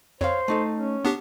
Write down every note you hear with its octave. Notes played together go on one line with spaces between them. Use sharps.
F2 C5 C#5 F5
A3 D#4 A4
C#4
B3 D4 G4